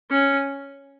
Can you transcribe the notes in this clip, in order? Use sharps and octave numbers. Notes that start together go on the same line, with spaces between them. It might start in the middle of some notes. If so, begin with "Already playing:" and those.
C#4